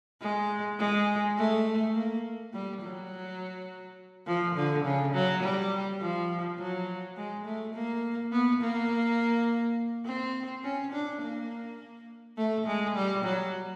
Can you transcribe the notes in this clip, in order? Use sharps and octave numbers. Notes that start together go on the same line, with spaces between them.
G#3
G#3
A3
A#3
G3
F#3
F3
D3
C#3
F#3
G3
F3
F#3
G#3
A3
A#3
B3
A#3
C4
C#4
D4
A#3
A3
G#3
G3
F#3